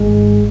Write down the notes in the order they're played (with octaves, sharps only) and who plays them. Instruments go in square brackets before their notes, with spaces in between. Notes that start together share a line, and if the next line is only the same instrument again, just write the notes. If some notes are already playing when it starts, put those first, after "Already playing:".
Already playing: [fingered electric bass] G#1 G#2 G#3